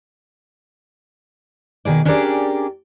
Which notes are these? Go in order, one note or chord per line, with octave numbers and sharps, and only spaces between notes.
B2 D#3 G#4 D5
C#4 D4 G4 G#4 A#4 D5